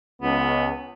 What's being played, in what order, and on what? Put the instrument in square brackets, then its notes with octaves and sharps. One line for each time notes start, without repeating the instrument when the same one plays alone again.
[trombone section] C#2 [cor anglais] B3